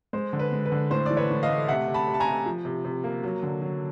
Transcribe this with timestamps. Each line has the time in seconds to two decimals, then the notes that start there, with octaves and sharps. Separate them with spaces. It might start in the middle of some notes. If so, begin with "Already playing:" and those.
0.13 G#3 C5
0.33 D3
0.39 B4
0.52 G#3
0.65 B4
0.72 D3
0.91 A2 C5
1.06 E3 D5
1.17 B4 C#5
1.30 A2
1.43 D#5 F5
1.49 A3
1.68 C3 E5 F#5
1.88 C3
1.94 A5 B5
2.07 C3
2.14 A5
2.20 G#5 A#5
2.27 C3
2.46 F3
2.65 C3
2.85 C3
3.04 A#3
3.23 F#3
3.43 D3
3.62 F#3